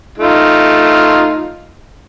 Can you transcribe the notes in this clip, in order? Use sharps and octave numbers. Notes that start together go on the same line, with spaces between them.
A3 D#4 F4